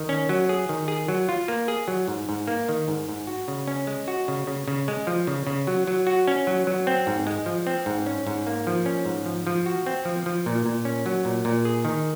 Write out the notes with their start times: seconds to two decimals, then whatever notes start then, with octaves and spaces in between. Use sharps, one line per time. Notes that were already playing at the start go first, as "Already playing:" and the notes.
Already playing: D#3
0.09 C#4
0.29 F#3
0.49 G#4
0.69 D#3
0.88 G#4
1.08 F#3
1.29 F4
1.48 A#3
1.68 G#4
1.88 F#3
2.08 G#2
2.29 G#2
2.47 A#3
2.69 D#3
2.88 G#2
3.09 G#2
3.27 F#4
3.48 C#3
3.67 C#4
3.87 G#3
4.08 F#4
4.28 C#3
4.47 C#3
4.68 C#3
4.88 G#3
5.07 F3
5.27 C#3
5.47 C#3
5.67 F#3
5.87 F#3
6.07 F#4
6.28 C#4
6.47 F#3
6.67 F#3
6.87 C4
7.07 G#2
7.27 G#3
7.46 F3
7.67 C4
7.86 G#2
8.06 C#4
8.27 G#2
8.47 A#3
8.67 F3
8.86 C#4
9.05 G#2
9.26 F3
9.47 F3
9.66 F#4
9.86 C4
10.05 F3
10.26 F3
10.46 A#2
10.66 A#2
10.85 C#4
11.06 F#3
11.25 A#2
11.45 A#2
11.65 G#4
11.85 D#3